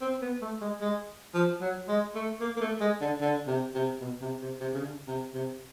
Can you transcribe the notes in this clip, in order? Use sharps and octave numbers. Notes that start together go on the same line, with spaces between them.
C4
B3
A3
G#3
G#3
F3
F#3
G#3
A3
A#3
A#3
A3
G#3
D3
D3
C3
C3
B2
C3
C3
C3
C#3
D3
C3
C3